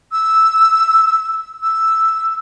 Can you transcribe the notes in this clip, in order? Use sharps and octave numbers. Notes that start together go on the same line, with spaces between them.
E6
E6